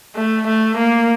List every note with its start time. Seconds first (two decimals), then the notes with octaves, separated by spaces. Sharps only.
0.16 A3
0.47 A3
0.77 A#3